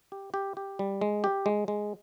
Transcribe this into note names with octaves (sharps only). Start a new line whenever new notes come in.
G4
G4
G4
G3
G#3
G4
G#3
G#3